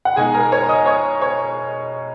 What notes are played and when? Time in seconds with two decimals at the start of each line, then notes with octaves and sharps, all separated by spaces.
0.05 F#5
0.16 B2 G#3 D#4 G#4 G#5
0.34 A#4 A#5
0.52 C#5 C#6
0.68 D#5 D#6
0.86 C#5 C#6
1.21 C#5 C#6